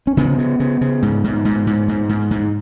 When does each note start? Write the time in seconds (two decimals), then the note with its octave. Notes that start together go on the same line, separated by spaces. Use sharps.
0.07 C#4
0.17 C#3 B3
0.38 C#3
0.60 C#3
0.81 C#3
1.03 G#2
1.24 G#2
1.45 G#2
1.67 G#2
1.88 G#2
2.09 G#2
2.31 G#2